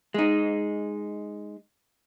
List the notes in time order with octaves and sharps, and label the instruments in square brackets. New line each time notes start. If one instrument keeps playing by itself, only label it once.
[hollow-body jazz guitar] G#3 D#4